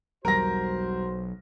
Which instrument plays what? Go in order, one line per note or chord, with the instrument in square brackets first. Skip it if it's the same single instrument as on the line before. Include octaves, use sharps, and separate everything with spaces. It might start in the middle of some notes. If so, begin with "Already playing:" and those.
[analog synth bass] B1 [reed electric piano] E2 G3 [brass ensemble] F#4 C5 [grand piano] A#4 A#6